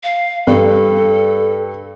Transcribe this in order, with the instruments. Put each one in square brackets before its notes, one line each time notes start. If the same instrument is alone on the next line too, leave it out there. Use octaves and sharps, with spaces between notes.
[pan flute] F5
[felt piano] G2 [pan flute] A4